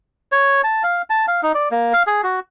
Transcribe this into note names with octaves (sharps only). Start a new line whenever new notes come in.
C#5
A5
F5
A5
F5
D#4
D5
A#3
F5
G#4
F#4